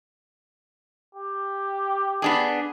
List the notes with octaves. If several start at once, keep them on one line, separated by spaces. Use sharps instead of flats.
G4
B3 D4 G#4